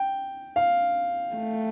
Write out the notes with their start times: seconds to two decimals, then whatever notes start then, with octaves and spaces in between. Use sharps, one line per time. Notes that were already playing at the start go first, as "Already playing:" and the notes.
Already playing: G5
0.56 F5
1.35 A3